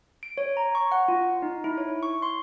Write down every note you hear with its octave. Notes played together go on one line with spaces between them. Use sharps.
D7
C#5
A#5
C#6
F#5
F4
D#4
E4
C#5
C#6
C6